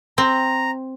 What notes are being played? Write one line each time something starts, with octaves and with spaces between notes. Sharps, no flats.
C4 A#5